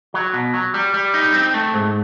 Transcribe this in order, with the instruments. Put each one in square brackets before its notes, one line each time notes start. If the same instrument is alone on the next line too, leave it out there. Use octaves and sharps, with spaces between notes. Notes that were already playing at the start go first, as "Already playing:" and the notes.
[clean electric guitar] F#3
B2
F#3
G3
G3
D#4
C4
A3
G#2